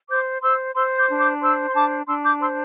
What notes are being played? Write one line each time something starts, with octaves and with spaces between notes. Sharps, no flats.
C5 D6 G6
C5 C6 E6
C5 C6 E6
D6 G6
D4
D6 G6
C5 C6 E6
C6
D4 A5 D6
D4 C6 E6
D6 G6
C5 C6 E6